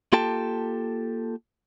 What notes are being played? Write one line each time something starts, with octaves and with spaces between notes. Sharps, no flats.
A#3 F4 G4 A4 G5 A5